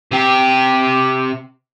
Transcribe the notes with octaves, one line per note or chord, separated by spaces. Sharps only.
C3 G4